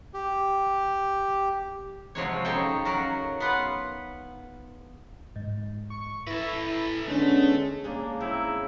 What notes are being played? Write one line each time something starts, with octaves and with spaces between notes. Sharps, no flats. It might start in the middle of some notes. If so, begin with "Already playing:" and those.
G4
C3 F3 F#3 G#3 C4 C#5
C#3 D#4 A4 C#5 G5
C#3 F#3 F#4 A#4
B3 F4 B4 F#5
G#2
C#6
E4 A4 B4 A#6
D3 G#3 A3 B3 C#4
G#3 A#3 C#4 D4
C#3 C4 D#4 E4